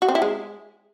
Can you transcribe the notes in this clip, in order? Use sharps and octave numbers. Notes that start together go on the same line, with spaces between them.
F#4
C4
E4
G#3